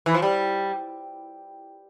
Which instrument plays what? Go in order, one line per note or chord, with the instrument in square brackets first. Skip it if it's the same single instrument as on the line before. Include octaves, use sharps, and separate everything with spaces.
[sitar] E3
F3
G3